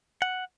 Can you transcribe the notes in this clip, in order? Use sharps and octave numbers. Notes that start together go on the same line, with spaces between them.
F#5